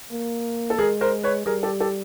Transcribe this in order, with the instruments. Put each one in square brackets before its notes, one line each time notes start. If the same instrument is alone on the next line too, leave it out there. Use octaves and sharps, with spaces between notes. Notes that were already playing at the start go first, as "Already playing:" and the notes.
[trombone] A#3
[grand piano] A4
[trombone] G#3 [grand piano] G#4 A#4
[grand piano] A#4 C5
B4 C#5
[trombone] G3 [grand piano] G#4 A#4
[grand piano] G4 A4
G4 A4